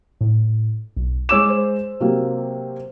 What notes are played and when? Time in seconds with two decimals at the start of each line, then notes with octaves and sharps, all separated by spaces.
0.21 A2
0.96 B1
1.29 G#3 C#5 D6 E6 E7
1.49 C5
2.00 C3 F#3 A#3